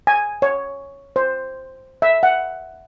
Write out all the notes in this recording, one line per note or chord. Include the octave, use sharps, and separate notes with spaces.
G#5
C#5
C5
E5
F#5